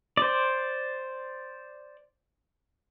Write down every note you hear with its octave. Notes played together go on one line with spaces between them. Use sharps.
C5 D5